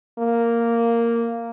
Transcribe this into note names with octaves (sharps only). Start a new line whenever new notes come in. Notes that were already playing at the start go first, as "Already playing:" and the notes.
A#3